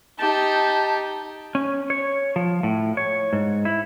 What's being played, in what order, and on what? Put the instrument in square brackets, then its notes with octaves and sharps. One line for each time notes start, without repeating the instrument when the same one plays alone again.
[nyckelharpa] D#4 G4 [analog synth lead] A5
[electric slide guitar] C#4
C#5
F3
A2
C#5
G#2
E4